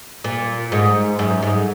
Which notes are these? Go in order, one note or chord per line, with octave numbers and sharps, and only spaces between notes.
A#2
G#2
F#2
G#2